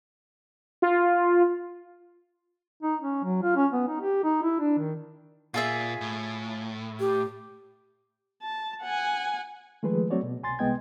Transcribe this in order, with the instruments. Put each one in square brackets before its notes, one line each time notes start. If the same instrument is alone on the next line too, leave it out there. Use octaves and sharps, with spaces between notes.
[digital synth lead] F4
[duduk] D#4
C#4
F#3
F4
C#4
B3
D#4
G4
D#4
E4
D4
D#3
[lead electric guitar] A#2 [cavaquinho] F4 G#4 E5
[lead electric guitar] A2
[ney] G4
[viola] A5
F#5 G#5
[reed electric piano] D#3 F3 G#3 A3 G#4 B4
F#3 A3 C4 F#4 C#5 D5
B2
C2 G#5 C6 A6
C2 G#3 B3 D#5 G5 G#6